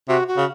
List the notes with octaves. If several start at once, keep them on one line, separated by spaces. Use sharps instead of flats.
C3 F#4
F#4
C#3